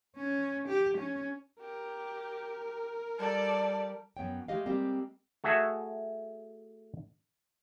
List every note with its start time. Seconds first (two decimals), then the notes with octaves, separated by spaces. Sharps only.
0.17 C#4
0.68 G4
0.98 C#4
1.62 G4 A#4
3.19 G3 A4 D5
4.17 F#2 B3 C#5 G5
4.48 G#3 A3 G4 D#5 F5
4.66 G3 G#3 A#3 C4 G4
5.44 A3 F#4 G#4 E5